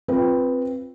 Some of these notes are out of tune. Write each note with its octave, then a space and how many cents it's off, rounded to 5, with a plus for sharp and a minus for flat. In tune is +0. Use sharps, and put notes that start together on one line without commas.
C4 +5 F4 +0 B4 -5